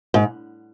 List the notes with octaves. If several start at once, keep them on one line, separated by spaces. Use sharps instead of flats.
G#2